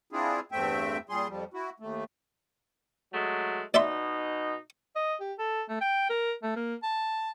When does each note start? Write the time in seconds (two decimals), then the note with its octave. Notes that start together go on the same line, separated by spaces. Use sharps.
0.13 C4 D4 E4 F4 G#4
0.52 E2 G2 A3 C4 E5 G5
1.09 A#2 G3 G#4 C6
1.29 F2 F3 G3
1.54 E4 F#4
1.80 D#2 A3
3.13 F#3 G#3 A3
3.74 B2 D#4 D5 E5 C6
4.95 D#5
5.20 G4
5.39 A4
5.69 A3
5.81 G5
6.10 A#4
6.43 A3
6.56 A#3
6.83 A5